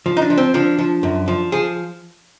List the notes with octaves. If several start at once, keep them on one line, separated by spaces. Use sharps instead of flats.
F3
D#4
D4
F3
C4
F3 D4
F3
F#2
F3
F3 G#4